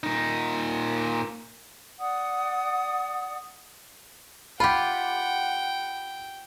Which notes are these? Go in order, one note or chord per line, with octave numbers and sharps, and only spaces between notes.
A#2 D#4
D5 F#5 D#6
F4 G4 F#5 G5 B5